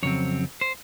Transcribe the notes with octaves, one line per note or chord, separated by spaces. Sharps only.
F2 C#3 F#3 C4 C#5
C5